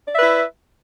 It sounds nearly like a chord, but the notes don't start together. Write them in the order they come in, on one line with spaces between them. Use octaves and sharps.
D5 E5 B4 E4